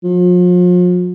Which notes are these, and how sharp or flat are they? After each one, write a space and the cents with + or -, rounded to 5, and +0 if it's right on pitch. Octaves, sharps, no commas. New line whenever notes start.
F3 +40